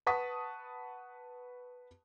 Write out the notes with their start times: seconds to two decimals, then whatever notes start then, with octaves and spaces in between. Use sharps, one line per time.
0.07 B4 F#5 A5 C#6 D#6 B6